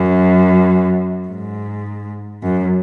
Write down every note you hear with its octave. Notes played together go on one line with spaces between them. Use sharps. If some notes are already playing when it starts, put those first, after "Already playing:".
Already playing: F#2
G#2
F#2